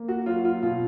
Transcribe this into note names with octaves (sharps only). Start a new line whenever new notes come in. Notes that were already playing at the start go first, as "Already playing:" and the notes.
Already playing: A#3
F#4
F#3 F4
F4
B2 F4